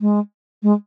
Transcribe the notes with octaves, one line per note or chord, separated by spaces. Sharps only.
G#3
G#3